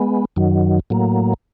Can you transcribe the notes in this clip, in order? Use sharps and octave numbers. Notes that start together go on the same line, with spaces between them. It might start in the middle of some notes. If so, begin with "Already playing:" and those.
Already playing: G#3 B3
F#2 D#3 F#3
A2 F#3 A#3